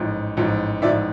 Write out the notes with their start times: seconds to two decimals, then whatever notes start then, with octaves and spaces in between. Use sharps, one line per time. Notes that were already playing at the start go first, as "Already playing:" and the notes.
Already playing: A1 G#2 F3
0.37 A1 G#2 F3
0.82 A1 G#2 F3 D5 E5